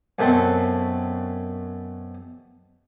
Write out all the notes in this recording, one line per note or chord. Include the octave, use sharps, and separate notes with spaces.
F#2 B2 A3 C4